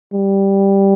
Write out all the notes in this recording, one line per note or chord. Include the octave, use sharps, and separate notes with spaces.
G3